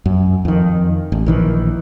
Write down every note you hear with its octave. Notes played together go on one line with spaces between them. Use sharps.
F#2
F2 D#3
A1
A#1 D#3 E3